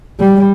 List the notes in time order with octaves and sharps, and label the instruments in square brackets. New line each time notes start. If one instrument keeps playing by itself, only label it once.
[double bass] G3